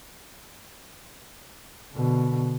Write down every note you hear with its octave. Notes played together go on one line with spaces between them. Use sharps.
B2 D3